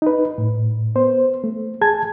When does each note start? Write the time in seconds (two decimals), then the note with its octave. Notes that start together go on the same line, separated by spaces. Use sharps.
0.02 D#4 B4
0.38 A2
0.96 B3 C5
1.44 A3
1.81 G#4 G#5 A5 G#6